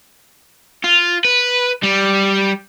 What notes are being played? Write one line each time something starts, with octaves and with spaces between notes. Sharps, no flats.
F4
B4
G3